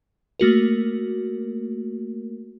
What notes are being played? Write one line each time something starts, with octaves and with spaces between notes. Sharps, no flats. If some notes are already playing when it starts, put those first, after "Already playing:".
A3 A#3 F#4 A#4